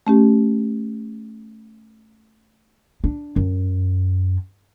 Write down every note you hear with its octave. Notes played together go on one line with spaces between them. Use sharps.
A3 C#4 G4
D4
F#2